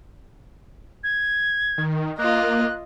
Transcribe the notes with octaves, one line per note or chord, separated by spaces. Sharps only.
G#6
D#3
A#3 F4 D#5 F#6